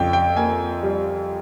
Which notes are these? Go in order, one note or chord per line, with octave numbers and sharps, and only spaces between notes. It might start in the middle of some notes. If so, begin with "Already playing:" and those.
Already playing: F2 C#3 G5
G5
A#3 G#5
G3